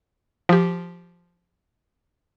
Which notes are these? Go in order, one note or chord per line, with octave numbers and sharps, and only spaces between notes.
F3 G4